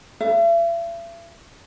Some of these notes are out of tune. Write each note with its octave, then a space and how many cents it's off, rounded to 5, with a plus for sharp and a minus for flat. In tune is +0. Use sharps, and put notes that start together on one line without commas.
E5 +40